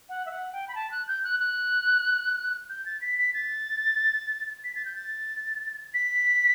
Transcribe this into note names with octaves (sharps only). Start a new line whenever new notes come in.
F#5
E5
F#5
G5
B5
A5
F#6
G6
F#6
F#6
G6
A6
B6
B6
A6
B6
A6
G6
A6
B6